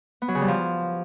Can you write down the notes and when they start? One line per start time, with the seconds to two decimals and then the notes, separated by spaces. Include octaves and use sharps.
0.22 B3
0.28 F#3
0.35 C#3
0.41 G3
0.48 F3